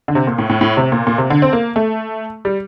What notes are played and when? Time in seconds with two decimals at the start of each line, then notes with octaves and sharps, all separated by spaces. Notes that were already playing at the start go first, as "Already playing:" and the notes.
0.08 D3
0.15 C3
0.27 A#2
0.38 A2
0.50 A2
0.61 A2
0.77 C3
0.92 A#2
1.07 A#2
1.18 C3
1.30 D3
1.42 C4
1.53 A#3
1.76 A3
2.45 G3